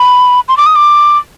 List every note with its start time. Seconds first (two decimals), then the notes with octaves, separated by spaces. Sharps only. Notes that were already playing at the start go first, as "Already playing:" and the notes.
Already playing: B5
0.48 C6
0.57 D6
0.66 D#6
0.76 D6